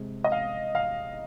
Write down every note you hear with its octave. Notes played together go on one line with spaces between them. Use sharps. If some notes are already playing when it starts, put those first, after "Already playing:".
Already playing: C3 G#3
D#5
F5
F5